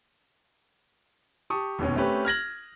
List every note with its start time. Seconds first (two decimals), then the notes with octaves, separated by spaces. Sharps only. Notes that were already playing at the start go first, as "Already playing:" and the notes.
1.50 G4 A5 C#6 D#6
1.79 F1 D#2 B2 C#4
1.96 A3 C4 C#4 G4 B4
2.25 F6 G#6 A#6 F#7